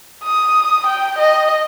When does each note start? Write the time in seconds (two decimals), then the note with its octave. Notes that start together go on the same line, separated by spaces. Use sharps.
0.24 D#6
0.87 G5
1.19 D#5